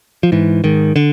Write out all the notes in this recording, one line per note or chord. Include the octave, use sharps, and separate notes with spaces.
F3
G#2 E3
G#2 D#3
D3